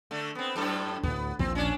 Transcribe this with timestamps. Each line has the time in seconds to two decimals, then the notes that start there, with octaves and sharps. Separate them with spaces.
0.11 D3 A3
0.35 B3 C4
0.56 F#2 A2 A4
1.03 D2 A2 B3
1.39 A#1 D#2 A#2 C4
1.55 C#4 D4